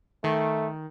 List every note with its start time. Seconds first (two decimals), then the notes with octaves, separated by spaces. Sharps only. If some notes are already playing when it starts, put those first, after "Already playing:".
0.24 D#3 A3